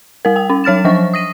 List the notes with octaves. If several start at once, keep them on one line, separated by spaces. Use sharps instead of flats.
G3 A#4
G5
C#4
F#3 C#5 F6 A6 E7
F3 F#3 C5 C#6
D#6 A#6 D#7